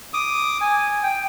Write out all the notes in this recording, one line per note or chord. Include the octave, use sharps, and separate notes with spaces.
D6 D#6
G#5
G5